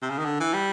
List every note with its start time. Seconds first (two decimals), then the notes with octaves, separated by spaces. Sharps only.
0.02 C3
0.10 C#3
0.19 D#3
0.25 D3
0.40 E3
0.54 G3